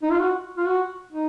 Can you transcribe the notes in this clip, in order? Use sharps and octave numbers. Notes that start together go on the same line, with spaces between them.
D#4
F4
F#4
F4
F#4
D#4